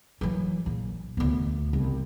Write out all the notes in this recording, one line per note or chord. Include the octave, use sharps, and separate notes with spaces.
E3 F#3
A#1
D2 B3
C2